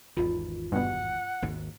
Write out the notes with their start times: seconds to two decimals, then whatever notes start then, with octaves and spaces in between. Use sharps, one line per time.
0.17 G#1 E2 D#3 F4 D#5
0.72 G2 B2 F#5
1.42 G#1 D#2 G#2